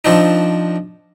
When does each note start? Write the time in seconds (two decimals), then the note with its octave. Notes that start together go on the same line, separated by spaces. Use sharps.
0.05 F3 C4 D4 D#4